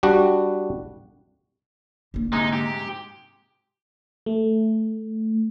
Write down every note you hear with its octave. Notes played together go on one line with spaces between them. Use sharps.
G3 D4 F#4
D3 A#3
G#2 C3 G#3 D#4
G4
A3